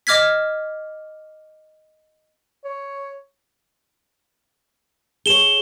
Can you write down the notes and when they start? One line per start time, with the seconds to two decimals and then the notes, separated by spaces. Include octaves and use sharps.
0.07 D#5 D6 F6 G#6 B6
2.64 C#5
5.26 G#4 C#5 E7 G7